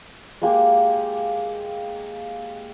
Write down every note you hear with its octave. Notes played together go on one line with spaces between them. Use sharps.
G#3 A#3 G4